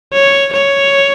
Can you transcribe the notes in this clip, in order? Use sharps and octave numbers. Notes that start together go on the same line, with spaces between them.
C#5
C#5